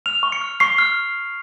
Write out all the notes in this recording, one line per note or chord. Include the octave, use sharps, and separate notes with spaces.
F6 F7
C#6
C#7
F6
C#6 C7
F6